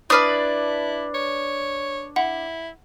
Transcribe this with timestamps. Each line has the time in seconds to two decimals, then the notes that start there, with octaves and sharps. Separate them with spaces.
0.10 D4 E4 B4 D5 D#6 F6
1.15 C#5
2.16 E4 F#5